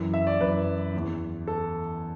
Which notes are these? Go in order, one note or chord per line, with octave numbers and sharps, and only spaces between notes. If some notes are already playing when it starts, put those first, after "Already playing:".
Already playing: F#2 E3
E5
D5
F#2 E3 B4
E2 E3
A4